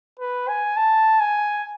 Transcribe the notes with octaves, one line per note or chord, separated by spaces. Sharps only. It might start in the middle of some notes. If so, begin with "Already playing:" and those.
B4
G#5
A5
G#5